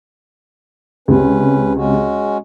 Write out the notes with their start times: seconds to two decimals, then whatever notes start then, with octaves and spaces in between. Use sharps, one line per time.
1.08 C#2 C3 C#4 B4
1.76 G#3 C#4 F#4